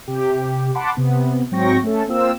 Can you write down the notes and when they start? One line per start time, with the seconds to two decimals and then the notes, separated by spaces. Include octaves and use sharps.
0.08 C3 G4
0.75 F#5 A5 B5 C6 D6
0.97 C3 B3
1.51 G#2 F#3 C4 G5 C#6 A#6
1.83 A3 C#4 A4
2.08 A#3 C4 F4 E6